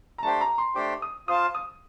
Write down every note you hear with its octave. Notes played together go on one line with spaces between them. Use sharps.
A#5
A3 D4 G4 C5 G5 A5
A#5
C6
A3 D4 G4 C5 G5 D6
D#6
F4 C5 F5 A5 D#6
D#6